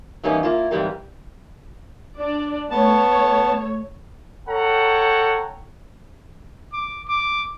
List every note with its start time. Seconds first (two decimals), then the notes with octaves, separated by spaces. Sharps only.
0.24 E3 G3 A#3 C#4 D#4
0.43 A#3 E4 F4
0.71 G#2 C3 E3 G3 A#3
2.18 D4 D5
2.71 A3 B3 C#5 A5
4.48 A4 C#5 F#5 G5 A#5
6.73 D6
7.08 D6